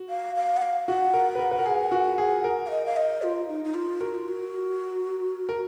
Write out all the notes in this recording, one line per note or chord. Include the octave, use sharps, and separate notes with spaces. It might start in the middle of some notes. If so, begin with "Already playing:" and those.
Already playing: F#4
F5
F5
F#5
F5
F#4 F#5
A#4
B4
A#4
B4
A#4
G#4
F#4
G#4
A#4
F5
D#5
F5
D#5
F4
D#4
D#4
F4
F#4 A#4
F4
F#4
A#4